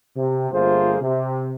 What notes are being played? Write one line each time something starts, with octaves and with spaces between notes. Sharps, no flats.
C3
G1 A3 A#3 F4 G#4 C5
C3